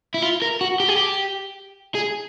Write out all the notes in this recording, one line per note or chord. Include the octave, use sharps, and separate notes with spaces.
E4
F4
A#4
F#4
G4
G#4
G4
G#4